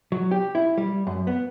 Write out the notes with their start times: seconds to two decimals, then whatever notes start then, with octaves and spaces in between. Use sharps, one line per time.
0.12 F#3
0.31 G4
0.55 E4
0.77 G3
1.07 F#2
1.27 B3